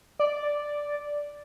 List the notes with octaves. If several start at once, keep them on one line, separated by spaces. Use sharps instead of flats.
D5